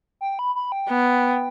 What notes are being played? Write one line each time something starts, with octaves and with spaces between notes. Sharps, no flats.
G5
B5
B5
G5
B3